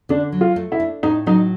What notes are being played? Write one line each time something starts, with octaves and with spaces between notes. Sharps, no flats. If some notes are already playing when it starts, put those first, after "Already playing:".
D3 D4
F#3
F4
A3
E4
D4
A2 D#4
F#3 D#4